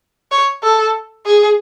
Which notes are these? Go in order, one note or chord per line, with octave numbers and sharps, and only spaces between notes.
C#5
A4
G#4